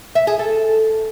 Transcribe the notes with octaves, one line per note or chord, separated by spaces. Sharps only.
E5
G#4
A4